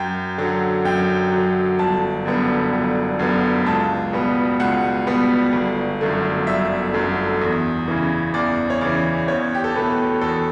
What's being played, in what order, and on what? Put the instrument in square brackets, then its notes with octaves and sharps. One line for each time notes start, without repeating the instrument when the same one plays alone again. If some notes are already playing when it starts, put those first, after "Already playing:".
Already playing: [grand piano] F#2 G5
D3 F#3
F#2 G5
F#3
D3
G1 A5
F#2 D3 G3 B3
G1
F#2 D3 G3 B3
C#2 A5
B2 G3 B3
C#2 F#5
B2 G3 B3
G1
F#2 D3 A3
G1 E5
F#2 D3 A3
E2
C#3 E3
E2 D5
C#5
C#3 E3 D5
E2 C#5
G4
A4
B2 A3 B4
E2 A4